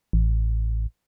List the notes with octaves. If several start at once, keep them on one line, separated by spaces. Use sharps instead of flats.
A1